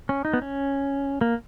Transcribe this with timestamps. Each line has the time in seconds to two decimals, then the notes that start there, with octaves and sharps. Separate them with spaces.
0.09 C#4
0.25 D#4
0.33 B3
0.42 C#4
1.21 A#3